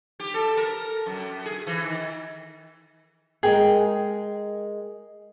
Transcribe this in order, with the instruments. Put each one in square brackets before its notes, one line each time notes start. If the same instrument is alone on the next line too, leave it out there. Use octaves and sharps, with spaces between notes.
[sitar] G4
A4
A#4
F#2
G#4
E3
D#3
[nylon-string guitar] G#3 A#4 G5 [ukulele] G#4